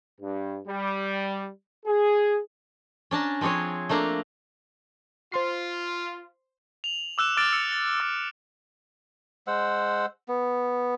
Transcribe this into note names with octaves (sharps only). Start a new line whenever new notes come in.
G2
G3
G#4
C#4 D4 A5 A#5
F3 C4 D4 G#4 C#5
A3 A#3 D4 F5 A#5
F4 C5 C6 C7
F7 F#7
D6 E6 F#6 E7
D6 E6 F6 A6 D7
E6 C#7
A6
D6 E6 A6
G#3 C5 F#5 E6
B3